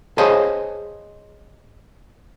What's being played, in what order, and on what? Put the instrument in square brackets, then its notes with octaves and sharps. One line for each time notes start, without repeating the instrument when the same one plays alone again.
[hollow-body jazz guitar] G#4 C5 C#5 D#5 F5 A5